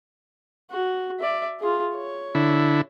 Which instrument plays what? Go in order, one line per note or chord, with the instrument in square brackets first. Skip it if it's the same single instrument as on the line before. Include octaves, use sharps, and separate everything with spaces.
[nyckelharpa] F#4
D5 E5
F4 G#4
C#5
[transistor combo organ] D3 E4